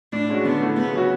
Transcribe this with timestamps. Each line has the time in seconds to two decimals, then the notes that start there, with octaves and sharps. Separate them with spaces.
0.12 A2 D4
0.29 G#3 C#4 F#4
0.45 D3 B3
0.61 A3 E4
0.76 C#3 B3
0.93 F#3 C#4 F#4